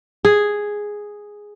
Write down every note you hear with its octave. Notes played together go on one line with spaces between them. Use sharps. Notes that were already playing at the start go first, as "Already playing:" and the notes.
G#4